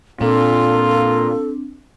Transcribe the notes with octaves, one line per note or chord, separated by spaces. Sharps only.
A#2 C4 D4 F4 A4